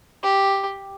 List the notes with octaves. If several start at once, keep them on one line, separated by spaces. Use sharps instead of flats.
G4